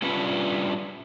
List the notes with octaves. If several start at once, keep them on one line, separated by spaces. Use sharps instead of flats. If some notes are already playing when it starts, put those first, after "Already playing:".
G3 C#4 D4 E4 F4 B4